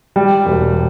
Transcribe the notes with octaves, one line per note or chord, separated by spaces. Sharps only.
G3
E1